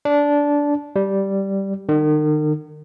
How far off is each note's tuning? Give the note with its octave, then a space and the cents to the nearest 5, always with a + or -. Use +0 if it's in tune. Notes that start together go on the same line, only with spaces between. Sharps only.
D4 -15
G3 -5
D#3 -40